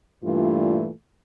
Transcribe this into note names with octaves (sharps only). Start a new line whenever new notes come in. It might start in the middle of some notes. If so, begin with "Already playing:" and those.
G2 A#2 E3 A3 F4